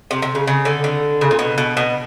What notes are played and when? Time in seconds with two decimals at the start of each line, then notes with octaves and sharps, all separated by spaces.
0.11 C3
0.22 C3
0.35 C#3
0.47 C#3
0.65 D3
0.84 D3
1.21 C#3
1.31 A#2
1.39 B2
1.58 B2
1.77 B2